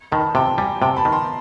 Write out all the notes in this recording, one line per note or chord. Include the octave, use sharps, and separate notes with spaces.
D#3 A5 B5
C3 G5 A5
G3 G#5 A#5
C3 G5 A5
A5 B5
D#3
A#5 C6